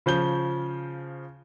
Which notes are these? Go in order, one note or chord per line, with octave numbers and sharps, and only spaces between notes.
C#3 F3 G6 G7